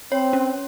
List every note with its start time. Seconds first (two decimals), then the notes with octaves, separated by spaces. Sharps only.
0.11 C4 C#5
0.33 C#4